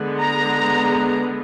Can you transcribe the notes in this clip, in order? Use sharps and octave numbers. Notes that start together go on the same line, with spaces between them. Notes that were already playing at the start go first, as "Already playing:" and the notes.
Already playing: D3 G#3 B3
A#5